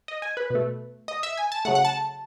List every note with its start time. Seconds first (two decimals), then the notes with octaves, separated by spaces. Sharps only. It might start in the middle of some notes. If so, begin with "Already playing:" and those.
0.08 D#5
0.22 G#5
0.37 B4
0.50 B2
0.55 A3
1.08 D#5
1.23 E5
1.37 G#5
1.52 A5
1.65 C#3 F#3 A3 F#5
1.75 F#5
1.85 A5